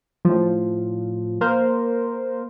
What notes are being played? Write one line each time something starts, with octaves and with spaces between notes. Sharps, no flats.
A2 F3
A#3 A#4 C5